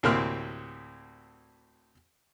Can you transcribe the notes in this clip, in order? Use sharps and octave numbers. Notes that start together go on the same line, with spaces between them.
D2 A2 C3 A#3 C4 F6